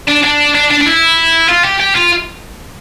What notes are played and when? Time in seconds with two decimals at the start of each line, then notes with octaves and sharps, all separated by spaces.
0.08 D4
0.24 D4
0.55 D4
0.70 D4
0.81 D4
0.86 E4
1.48 F4
1.64 G4
1.80 G4
1.95 F4